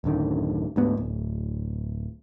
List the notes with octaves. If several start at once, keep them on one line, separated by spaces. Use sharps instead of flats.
D1 F#2 D3 D#3
D2 G#2 B3
D1